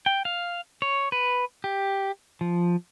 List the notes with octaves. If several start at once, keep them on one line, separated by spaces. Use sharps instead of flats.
G5
F5
C#5
B4
G4
F3